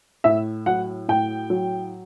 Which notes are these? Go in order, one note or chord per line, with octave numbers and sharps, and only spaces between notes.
A2 E5
F#3 F#5
A2 G5
F#3